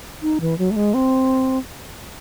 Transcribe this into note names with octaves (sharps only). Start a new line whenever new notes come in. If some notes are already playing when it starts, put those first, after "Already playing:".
D#4
E3
F#3
A3
G#3
C4